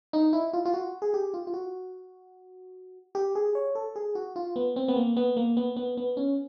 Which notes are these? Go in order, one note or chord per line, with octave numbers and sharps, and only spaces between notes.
D#4
E4
F4
F4
F#4
G#4
G4
F4
F4
F#4
G4
G#4
C#5
A4
G#4
F#4
F4
B3
C4
B3
A#3
B3
A#3
B3
B3
B3
C#4